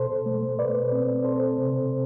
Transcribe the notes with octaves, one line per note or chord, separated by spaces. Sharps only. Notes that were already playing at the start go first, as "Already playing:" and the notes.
Already playing: B2 A4 C5
A3
B2 B4 D5
C4
C4 A4 C5
C3